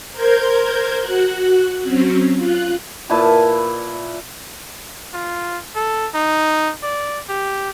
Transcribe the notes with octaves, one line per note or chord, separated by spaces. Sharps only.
A#4 C5 G6 G#6
F#4 F#6
F#3 C4 C#4
F4 F#6
A#2 E4 B4 A5
F4
A4
D#4
D5
G4